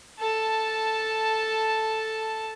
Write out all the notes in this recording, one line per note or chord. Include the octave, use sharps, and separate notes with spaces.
A4 A5